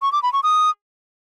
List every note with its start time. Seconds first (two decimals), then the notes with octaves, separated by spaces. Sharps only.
0.02 C#6
0.12 D6
0.23 B5
0.33 C#6
0.43 D#6